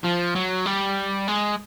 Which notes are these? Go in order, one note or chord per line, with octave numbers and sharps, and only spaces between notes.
F3
F#3
G3
G#3